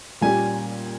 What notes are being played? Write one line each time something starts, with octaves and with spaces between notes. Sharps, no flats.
A#2 G3 C#4 G4 G#5